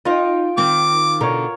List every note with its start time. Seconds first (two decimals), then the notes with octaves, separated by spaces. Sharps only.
0.05 D#4 F4 C5 D#5 G5
0.57 D#3 C4 D6
1.21 B2 D3 D#4 A#4 C#5